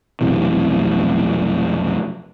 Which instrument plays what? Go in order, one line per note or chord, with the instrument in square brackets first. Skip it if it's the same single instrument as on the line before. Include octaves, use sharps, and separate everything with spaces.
[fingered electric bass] F1 B1 C3 E3